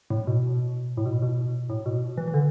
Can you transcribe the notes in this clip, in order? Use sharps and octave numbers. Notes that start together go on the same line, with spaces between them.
A2
B2
A2
B2
B2
A2
B2
E3
E3
D3